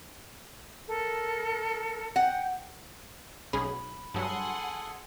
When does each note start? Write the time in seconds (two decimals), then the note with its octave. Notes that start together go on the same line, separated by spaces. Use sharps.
0.87 A4 A#4
2.16 F#5 G5
3.53 B1 C#4 G#4 B5
4.14 G2 F#3 G#4 A4 F#5 G#5 C6